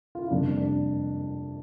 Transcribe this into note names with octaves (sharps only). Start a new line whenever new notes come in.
F4
E4
F2 C3 G3 A#3 D4
D4